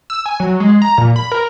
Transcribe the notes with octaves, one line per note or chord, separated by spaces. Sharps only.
E6
G#5
F#3
G#3
A#5
A#2
B5
A#4